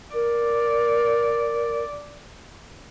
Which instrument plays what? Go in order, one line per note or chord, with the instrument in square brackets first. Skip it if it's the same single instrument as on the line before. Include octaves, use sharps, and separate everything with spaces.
[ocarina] A#4 [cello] D5